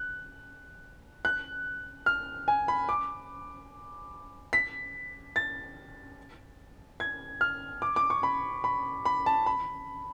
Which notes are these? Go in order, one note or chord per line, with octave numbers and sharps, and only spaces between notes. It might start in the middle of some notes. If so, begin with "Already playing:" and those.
Already playing: F#6
F#6
F6
G#5
B5
D6
B6
A6
G#6
F6
D6
D6
C#6
B5
B5
B5
A5
B5